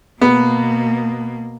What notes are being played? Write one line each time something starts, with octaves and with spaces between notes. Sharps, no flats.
B2 A#3 B3